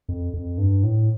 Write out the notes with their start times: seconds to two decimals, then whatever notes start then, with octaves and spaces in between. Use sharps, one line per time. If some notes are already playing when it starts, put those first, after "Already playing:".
0.09 F2
0.33 F2
0.58 G2
0.83 A2